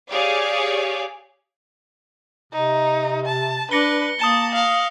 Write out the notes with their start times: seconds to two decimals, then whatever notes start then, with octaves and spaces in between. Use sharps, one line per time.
0.11 G4 G#4 C#5 D5 F5
2.53 C3 D#4
3.26 A5
3.71 D4 B4 A#6 C#7 G7
4.19 A#3 A5 D#6 E7 G7
4.55 F5